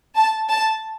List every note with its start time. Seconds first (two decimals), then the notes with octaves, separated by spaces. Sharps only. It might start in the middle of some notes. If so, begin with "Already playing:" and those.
0.16 A5
0.50 A5